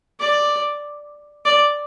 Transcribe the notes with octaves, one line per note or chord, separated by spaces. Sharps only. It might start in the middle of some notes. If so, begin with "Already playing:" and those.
D5
D5